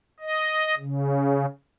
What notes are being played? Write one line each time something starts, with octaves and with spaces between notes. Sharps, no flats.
D#5
C#3